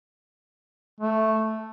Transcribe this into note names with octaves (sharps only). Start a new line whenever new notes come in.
A3